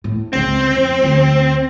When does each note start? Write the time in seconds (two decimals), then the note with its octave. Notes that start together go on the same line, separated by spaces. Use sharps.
0.04 A2
0.33 C#2 C#3 C4
0.74 F2 F3
1.02 D2